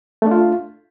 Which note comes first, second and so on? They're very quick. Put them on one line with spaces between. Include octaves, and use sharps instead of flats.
A3 D4 F4